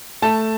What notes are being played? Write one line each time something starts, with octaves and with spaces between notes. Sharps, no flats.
A3 A5